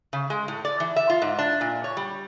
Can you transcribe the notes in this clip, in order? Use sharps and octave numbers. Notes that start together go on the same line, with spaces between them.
C#3
G#3
A2
D5
E3
E5
F4
G#2
D4
A#2
C#5
G3